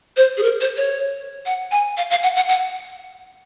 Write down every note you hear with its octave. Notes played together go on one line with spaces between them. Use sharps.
C5
G#4
A#4
C5
C#5
F#5
G#5
F5
F5
F#5
F#5
F#5